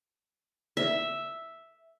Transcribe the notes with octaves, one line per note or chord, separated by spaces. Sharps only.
E5